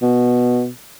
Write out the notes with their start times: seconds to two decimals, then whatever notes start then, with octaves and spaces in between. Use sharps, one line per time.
0.02 B2